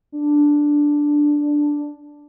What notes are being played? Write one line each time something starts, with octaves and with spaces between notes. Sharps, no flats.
D4